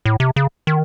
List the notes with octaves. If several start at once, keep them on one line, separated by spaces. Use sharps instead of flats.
A2
C3
C#3
D#3